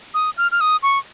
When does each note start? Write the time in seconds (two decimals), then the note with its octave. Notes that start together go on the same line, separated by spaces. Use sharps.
0.14 D#6
0.37 F6
0.52 F6
0.61 D#6
0.83 C#6